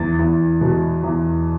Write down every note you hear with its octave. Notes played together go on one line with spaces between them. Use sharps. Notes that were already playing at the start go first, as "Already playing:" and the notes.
Already playing: E2 A6
E2
B2
E2